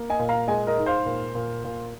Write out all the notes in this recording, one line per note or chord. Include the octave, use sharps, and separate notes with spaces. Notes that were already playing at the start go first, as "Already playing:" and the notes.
Already playing: A#3
D#5 G#5
A#2
F5 A#5
G#3 D#5 G#5
A#4 D#5
G#2
C5 F5
A#2
A#2
A#2